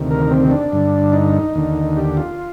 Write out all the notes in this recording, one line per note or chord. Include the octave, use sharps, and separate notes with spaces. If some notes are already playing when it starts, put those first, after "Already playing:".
Already playing: D2 C3 D#3
A#4
C4
D4
G2 D3
D#4
D#2 D3
G4
F4